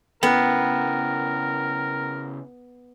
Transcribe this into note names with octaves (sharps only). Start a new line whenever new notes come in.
C#3 B3 E4 A#4 G5 F#6